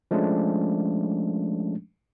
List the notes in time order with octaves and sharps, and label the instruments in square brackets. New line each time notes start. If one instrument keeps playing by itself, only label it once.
[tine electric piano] F3 G#3 A3 C#4 D4